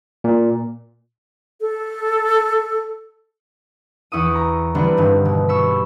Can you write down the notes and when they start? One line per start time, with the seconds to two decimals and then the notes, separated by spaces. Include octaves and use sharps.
0.24 A#2
1.61 A4
4.12 E2 E4 C#6 D#6
4.35 A#5
4.75 D3 E3 G3 B3 C4 D4
4.97 G2 D#3
5.25 B2
5.49 B5 C#6 E6